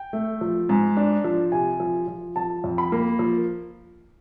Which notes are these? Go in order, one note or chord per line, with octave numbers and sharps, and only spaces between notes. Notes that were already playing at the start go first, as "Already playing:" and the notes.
Already playing: G5
A3
F3
G#2
D4
F3
C3 G#5
F3
F3
F3 A5
F2
B5
A#3
F3